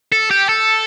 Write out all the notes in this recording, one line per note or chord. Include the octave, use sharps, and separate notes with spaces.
A4
G4
A4